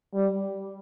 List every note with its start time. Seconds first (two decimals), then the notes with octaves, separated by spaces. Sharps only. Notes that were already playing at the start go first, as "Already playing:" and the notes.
0.14 G3